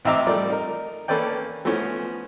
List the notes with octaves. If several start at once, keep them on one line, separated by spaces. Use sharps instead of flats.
A1 C4 D#4 E5 A#5 D6
F3 G3 A3 A#4 D5
D#4 A#4
A#3 C#4 A4 B4 D5 G5
E3 F3 A3 B3 C#4 C5